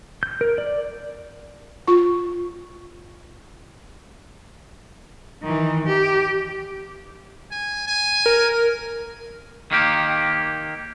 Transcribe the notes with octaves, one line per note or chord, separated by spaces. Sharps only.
G6
A#4
D5
F4 C#6
D#3 E3
G4
G#5
G#5
A#4
D#3 A#3 G4